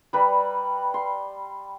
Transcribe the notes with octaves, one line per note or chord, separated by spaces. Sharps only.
G3 B4 A#5
C6